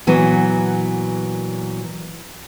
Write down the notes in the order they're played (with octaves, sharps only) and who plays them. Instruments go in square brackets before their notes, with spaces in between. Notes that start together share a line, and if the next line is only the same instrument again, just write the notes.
[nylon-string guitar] A#2 E3 F#3 B3